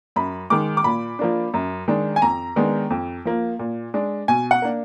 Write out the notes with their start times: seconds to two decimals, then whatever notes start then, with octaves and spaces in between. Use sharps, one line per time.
0.16 F#2 B5
0.50 D#3 G#3 D6
0.77 D6
0.84 A#2 B5
1.19 F3 A#3 D4
1.54 F#2
1.88 D#3 G#3 D4
2.16 G#5
2.22 F2 A#5
2.56 D#3 G#3 B3 D4
2.90 F2
3.25 F3 A#3
3.59 A#2
3.94 G#3 D4
4.28 B2 G#5
4.51 F#5
4.62 A#3 D4